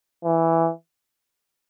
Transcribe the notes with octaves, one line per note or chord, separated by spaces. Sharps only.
E3